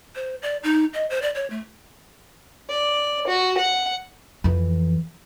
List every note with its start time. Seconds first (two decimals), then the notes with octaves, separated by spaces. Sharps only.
0.15 C5
0.42 D5
0.63 D#4
0.94 D#5
1.10 C5
1.22 D5
1.35 C#5
1.50 A3
2.70 D5
3.27 F#4
3.57 F#5
4.44 F2 E3